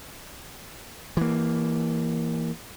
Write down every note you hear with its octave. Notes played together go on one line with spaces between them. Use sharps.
E3 A#3